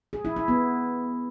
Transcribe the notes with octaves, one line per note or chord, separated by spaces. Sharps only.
G#4
E4
E4
B3